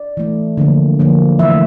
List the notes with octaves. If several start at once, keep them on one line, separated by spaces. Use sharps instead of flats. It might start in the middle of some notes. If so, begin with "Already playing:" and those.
Already playing: D5
E3 A3
D3 F3 A#3
D3 F3 A#3
E3 A3 E5